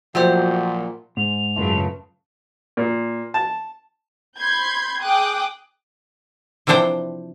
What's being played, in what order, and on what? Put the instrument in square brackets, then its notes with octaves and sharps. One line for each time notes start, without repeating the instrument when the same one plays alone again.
[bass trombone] A#2 [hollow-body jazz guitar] F3 F#3 [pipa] A3 G4 C5 [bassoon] F#4
[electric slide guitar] G#2 [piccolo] F7
[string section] F#2 C#3 F#3 [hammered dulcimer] A3 F4 B4
[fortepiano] A#2
A5
[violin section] B5 C6 G6 G#6
G#4 G5 D6 D#6 F#6
[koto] C3 E3 F3 D4 C5 G5